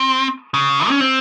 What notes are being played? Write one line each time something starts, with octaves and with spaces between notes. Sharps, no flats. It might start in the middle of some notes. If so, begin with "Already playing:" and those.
Already playing: C4
C#3
C#4
C4